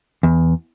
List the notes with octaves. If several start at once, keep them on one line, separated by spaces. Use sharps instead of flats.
E2